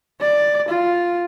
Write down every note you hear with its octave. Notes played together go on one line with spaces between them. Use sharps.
D5
F4